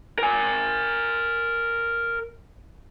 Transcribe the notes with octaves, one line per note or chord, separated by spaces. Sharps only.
A#4 G#5